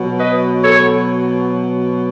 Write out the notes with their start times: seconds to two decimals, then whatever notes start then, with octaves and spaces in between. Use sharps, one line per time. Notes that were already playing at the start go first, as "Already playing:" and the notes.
Already playing: B2 F#3
0.20 B4 D#5
0.64 A4 C#5